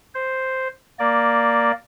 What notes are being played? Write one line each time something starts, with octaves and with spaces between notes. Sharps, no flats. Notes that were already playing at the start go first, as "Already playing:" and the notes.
C5
A#3 D5